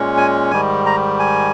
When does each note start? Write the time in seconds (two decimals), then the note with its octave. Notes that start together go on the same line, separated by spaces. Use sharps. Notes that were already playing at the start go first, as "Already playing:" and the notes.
Already playing: A#2 G#3 C#4
0.17 G#5
0.51 G#2 D#3 G3 G#5
0.86 A#5
1.19 G#5